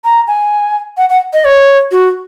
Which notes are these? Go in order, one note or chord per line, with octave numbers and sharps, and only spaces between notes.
A#5
G#5
F#5
F#5
D#5
C#5
F#4